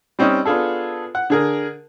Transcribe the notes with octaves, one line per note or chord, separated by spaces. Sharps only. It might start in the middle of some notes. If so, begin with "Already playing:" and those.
G3 C4 C#4 D#4 D#5
B3 D4 F4 G#4 A4
F#5
D3 G#4 A#4